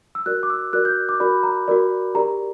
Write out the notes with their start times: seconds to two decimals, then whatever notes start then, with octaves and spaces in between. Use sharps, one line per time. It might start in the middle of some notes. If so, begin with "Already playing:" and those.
0.15 E6
0.26 F#4 A#4 D5 F#6
0.43 D6
0.50 E6
0.73 F#4 A#4 D5 F#6
0.85 G6
1.09 D6
1.20 F#4 A#4 D5 B5
1.43 A#5
1.68 F#4 A#4 D5
2.15 G4 A#4 D5 A#5